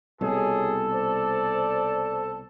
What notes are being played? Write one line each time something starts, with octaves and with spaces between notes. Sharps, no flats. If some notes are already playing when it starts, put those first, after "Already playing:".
C2 B2 G#4 A4 C#5
C5 D5